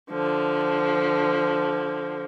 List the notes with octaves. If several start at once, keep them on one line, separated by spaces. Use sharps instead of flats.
D3 F3